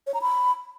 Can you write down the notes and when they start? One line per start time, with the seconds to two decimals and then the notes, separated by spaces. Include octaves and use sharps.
0.07 C#5
0.14 A#5
0.22 B5